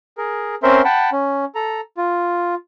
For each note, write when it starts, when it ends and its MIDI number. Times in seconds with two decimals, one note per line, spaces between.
0.18 0.55 68
0.18 0.55 70
0.63 0.82 60
0.63 0.82 61
0.63 0.82 70
0.63 0.82 72
0.63 0.82 76
0.63 0.82 84
0.84 1.10 78
0.84 1.10 79
0.84 1.10 81
0.84 1.10 83
1.12 1.45 61
1.55 1.81 69
1.55 1.81 82
1.97 2.55 65